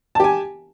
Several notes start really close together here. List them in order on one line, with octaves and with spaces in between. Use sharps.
A5 G4 G#5